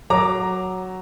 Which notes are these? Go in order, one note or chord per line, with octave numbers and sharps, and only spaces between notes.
F#3 A#5 D6